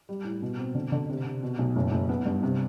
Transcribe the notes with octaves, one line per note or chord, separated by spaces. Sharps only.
G3
A2
B2
C4
D3
D3
C3
C3
B2
B1
F#1
F#1
B3
G2
C3